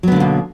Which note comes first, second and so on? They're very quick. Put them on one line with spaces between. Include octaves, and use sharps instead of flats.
F#3 B3 D3 A#3 B2